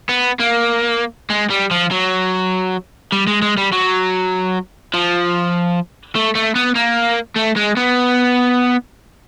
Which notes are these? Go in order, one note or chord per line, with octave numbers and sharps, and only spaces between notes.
B3
A#3
G#3
G3
F3
F#3
G3
G#3
G#3
G3
F#3
F3
A3
A3
B3
A#3
A3
G#3
B3